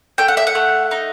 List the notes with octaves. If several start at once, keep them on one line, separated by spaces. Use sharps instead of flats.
A3 G5
F#5
E5
F#5
A3
D#4